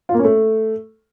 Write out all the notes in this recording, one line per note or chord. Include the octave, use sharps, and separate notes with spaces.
F4
A#3
C#4
A3